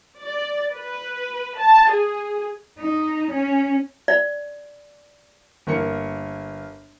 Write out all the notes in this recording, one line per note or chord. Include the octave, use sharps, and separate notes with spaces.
D5
B4
A5
G#4
D#4
C#4
D5
G1 A#3 A#4 C#7